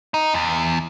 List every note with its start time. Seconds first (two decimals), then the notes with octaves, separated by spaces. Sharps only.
0.14 D#4
0.34 E2